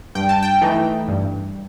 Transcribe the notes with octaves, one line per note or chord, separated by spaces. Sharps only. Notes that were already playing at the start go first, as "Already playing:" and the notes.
G2 G5
A5
G5
E3 A3 D#4
G2